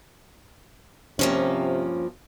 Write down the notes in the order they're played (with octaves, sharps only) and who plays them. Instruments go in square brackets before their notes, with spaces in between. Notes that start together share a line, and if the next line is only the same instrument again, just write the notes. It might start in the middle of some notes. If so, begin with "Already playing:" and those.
[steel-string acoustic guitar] G2 F3 A#3 [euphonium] C3 [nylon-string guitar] C#4